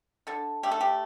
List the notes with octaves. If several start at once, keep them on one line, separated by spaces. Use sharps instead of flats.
D3 A4
A3 G4
A4
G4